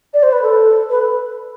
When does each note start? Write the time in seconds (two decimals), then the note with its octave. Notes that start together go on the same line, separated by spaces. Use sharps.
0.14 D5
0.23 C5
0.32 B4
0.43 A4
0.90 B4